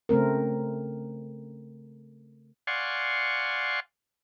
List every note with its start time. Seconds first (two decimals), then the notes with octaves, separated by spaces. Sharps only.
0.09 C#3 A3 C4 A#4
2.67 D5 F5 F#5 G#5 C6 C#6